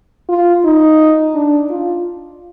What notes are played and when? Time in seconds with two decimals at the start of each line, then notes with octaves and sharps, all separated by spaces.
0.29 F4
0.65 D#4
1.35 D4
1.70 F4